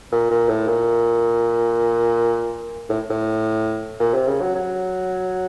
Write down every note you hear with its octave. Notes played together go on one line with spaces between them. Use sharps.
A#2
A#2
A2
A#2
A2
A2
A#2
C3
C#3
F#3
F#3